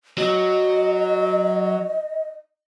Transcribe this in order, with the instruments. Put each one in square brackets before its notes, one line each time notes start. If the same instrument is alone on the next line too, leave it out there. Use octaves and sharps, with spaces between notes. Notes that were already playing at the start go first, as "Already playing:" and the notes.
[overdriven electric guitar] F#3 [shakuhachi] D#5